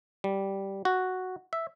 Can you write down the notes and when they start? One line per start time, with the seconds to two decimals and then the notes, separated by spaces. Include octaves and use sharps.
0.24 G3
0.85 F#4
1.53 E5